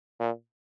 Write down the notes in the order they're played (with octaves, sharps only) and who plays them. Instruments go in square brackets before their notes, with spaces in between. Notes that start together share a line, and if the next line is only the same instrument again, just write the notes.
[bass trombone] A#2